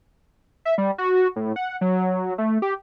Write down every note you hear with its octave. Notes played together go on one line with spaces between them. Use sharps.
E5
G3
F#4
A2
F#5
F#3
A3
G4